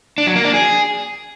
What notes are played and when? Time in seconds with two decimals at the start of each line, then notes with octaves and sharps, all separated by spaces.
0.18 D4
0.27 F#3
0.36 A#3
0.45 D4
0.54 G#4